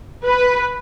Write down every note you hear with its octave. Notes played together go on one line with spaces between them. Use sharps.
B4